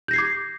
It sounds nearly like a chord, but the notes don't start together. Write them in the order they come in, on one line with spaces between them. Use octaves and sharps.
G6 A#6 C7 G#6 D6